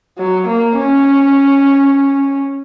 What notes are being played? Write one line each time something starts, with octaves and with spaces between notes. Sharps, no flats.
F#3
A#3
C#4